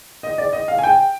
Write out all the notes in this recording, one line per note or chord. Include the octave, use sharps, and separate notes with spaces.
D#5
D5
D#5
F5
G#5
G5